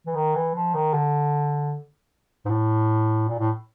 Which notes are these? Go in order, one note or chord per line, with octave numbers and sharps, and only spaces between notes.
E3
D#3
E3
F3
D#3
D3
G#2
A2
A#2
A2